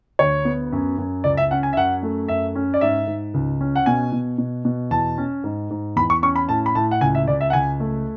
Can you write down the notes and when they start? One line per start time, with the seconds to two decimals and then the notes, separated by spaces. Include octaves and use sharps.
0.19 D2 C#5
0.45 B3
0.72 F#2
0.98 F#2
1.24 C#2 D5
1.37 E5
1.51 C#4 F#5
1.63 G#5
1.73 E5
1.77 F#2 F#5
2.03 A3
2.28 F#2 E5
2.55 C#4
2.74 D5
2.81 G#2 E5
3.07 G#2
3.34 C#2
3.61 C#4
3.76 F#5
3.86 B2 G#5
4.12 B2
4.38 B2
4.65 B2
4.91 E2 A5
5.18 C#4
5.44 G#2
5.70 G#2
5.96 E2 B5
6.10 C#6
6.22 C#4 C#6
6.36 B5
6.49 A2 A5
6.66 B5
6.75 A2 A5
6.91 F#5
7.01 C#2 G#5
7.15 E5
7.28 C#2 D5
7.41 E5
7.50 F#5
7.53 C#2 G#5
7.80 A3